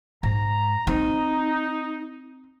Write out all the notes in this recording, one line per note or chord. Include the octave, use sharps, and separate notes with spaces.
G#2 A#5
C4 D#4